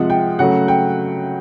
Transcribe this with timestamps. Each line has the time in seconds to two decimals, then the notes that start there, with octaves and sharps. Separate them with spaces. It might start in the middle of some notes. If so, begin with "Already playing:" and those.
Already playing: C3 F3 G#3 F#5
0.10 G5
0.39 C#3 F#3 A3 F#5
0.68 G5